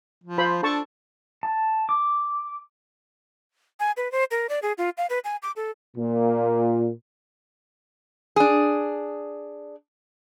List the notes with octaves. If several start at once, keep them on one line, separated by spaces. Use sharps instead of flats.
F3
F4 C5 B5
D4 A4 A5 C#6
A5
D6
G#5
B4
C5
A#4
D5
G#4
F4
F5
B4
G#5
D6
A4
A#2
D4 G#4